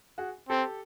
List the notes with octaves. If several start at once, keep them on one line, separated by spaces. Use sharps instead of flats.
F#4 G#4
C4 G4 A4